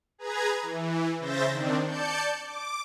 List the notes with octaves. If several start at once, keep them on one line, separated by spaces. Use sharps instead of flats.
G#4 B4 A#5 G#6
E3
C#3 C5 E5 G6 A6 A#6
D#3 C4 D4
D5 A5 G6 C#7
D6